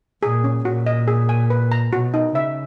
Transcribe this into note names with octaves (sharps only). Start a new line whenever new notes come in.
A#2 G#4
C#4
A#2 F#4
D#5
G#4
G#5
B4
A#5
B2 F#4
D#4
C#3 E5